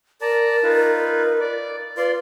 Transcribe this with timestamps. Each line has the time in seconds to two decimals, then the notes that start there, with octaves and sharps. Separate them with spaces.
0.22 A#4 D5 A5 A#5
0.63 D#4 F4 B4
1.41 D5 D6
1.97 F4 B4 D5 C6